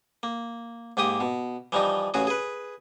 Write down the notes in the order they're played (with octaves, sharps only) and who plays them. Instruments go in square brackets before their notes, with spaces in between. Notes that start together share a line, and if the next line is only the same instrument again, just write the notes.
[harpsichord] A#3
G#2 A#3 G4 D#6
B2
E3 F3 G3 D#4
A1 C#3 F#4 G#4
G#4 B4